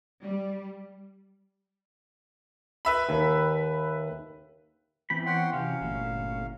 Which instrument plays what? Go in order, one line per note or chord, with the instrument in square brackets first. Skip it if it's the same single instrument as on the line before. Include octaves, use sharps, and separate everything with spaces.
[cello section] G3
[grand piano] B4 E5 B5
[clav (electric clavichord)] D#2
[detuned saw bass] E3 [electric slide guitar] B3 C4 [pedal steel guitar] G5 B5
[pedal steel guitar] C#5 [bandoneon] F#5 G5 C6
[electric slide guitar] C3 G4 F#5 [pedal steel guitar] F#3 C#4 [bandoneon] F5
[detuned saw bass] G1 [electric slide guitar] A#2 A3 E4